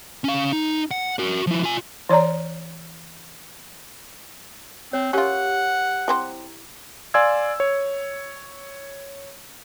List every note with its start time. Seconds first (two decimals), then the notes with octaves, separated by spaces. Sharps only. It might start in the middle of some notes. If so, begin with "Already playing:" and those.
0.24 C#4 F5
0.52 D#4
0.91 F#5
1.19 F#4 A#4
1.47 F3 E4
1.64 F4 G#5
2.09 E3 C#5 D5 A#5
4.93 C4 C#5
5.13 C#4 F4 G4 A#4 C#5 F#5
6.08 G3 C4 E4 C5
7.14 D5 F5 G#5 C6 E6 G#6
7.60 C#5